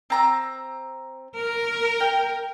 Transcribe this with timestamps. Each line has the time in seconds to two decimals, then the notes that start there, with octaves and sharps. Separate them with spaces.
0.10 C4 A#5 E6
1.36 A#4
2.00 G5